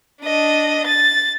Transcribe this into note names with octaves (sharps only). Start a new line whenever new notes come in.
D4 D#5
A6